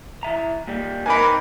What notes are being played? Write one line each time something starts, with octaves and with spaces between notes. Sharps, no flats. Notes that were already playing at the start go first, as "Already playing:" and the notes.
E3 E5 A#5
A#2 G3
C4 D#4 A#4 B4 G#5 B5 D6